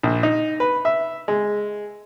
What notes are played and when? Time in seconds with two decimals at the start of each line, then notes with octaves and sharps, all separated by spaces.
0.03 A#1
0.23 D#4
0.60 B4
0.85 E5
1.28 G#3